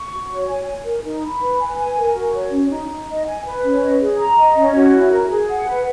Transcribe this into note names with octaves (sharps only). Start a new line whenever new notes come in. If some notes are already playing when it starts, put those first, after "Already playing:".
Already playing: C#6
F#4
C#5
G#5
G#5
A#4
D#4
B5
B4
G#5
G#5
A#4
F#4
C#5
C#4
D#4
D#4
D#5
G#5
B4
C#4
D#5
G#4
A#5
D#5
C#4
F#4
E4
A#4
G#4
F#5
B4